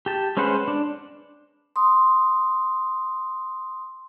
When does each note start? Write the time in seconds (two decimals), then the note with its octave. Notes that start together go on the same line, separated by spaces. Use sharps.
0.06 G4 A5
0.37 G#3 C#4 B4 C5 F#5
0.68 D4
1.76 C6 D#6